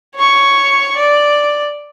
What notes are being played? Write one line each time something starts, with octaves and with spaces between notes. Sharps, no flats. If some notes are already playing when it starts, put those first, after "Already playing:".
C#5 C#6
D5